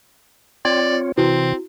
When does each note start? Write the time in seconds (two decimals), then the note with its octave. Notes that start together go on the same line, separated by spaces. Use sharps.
0.65 C4 F4 C#5 D5
1.17 C3 E3 C4 E4 F#4